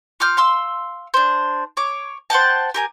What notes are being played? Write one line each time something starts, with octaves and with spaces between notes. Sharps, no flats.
F4 D6 F6 G6
F5 C6 E6
D4 C5
C#5 D6
C5 F#5 G5 A5
G4 A#4 G#5